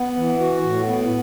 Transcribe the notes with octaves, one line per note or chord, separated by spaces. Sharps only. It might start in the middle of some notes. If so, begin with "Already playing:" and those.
Already playing: B3
E3
F#4
A2
B3